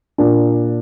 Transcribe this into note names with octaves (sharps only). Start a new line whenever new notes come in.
A#2 A#3 D4